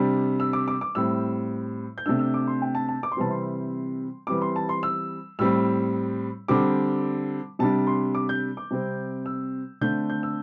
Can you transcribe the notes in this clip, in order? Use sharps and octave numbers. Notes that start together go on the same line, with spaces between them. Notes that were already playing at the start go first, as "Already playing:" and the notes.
Already playing: C3 G3 D4
E6
D6
D6
D6
A2 G3 C4 E6
G6
C3 A3 D4 E6
E6
D6
C6
G5
A5
A5
D6
C6
C3 E3 G3 C4 A5
C6
E3 G3 C4 D6
C6
A5
C6
E6
A2 G3 C4 E6
D3 G3 C4 D6
C3 G3 D4 A5
C6
D6
G6
D6
C3 G3 C4
E6
D3 A3 C4 G6
G6
E6